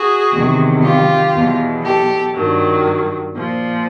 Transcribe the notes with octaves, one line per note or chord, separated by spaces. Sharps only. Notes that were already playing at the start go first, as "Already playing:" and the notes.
Already playing: F#4 G#4
E2 C3 D#3 F#3
F4 G4
E2 B2 F#3
G4 A4
G2 D#3 F#3
A#2 F3